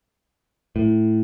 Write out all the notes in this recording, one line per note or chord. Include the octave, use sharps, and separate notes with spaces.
A2